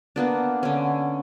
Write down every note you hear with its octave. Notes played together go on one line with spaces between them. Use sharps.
A#3 B3 D4
D3 C#4